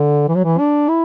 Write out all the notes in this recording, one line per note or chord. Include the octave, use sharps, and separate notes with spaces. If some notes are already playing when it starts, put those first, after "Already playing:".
Already playing: D3
E3
F#3
E3
D4
E4